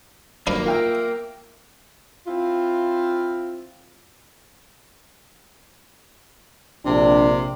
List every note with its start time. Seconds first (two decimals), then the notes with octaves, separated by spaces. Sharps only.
0.47 G2 D#3 F#3 A#3 D4 B4 F5
0.66 F4 A#4 E5 G5 F6
2.27 C4 E4 F4
6.85 A#1 C3 D4 D5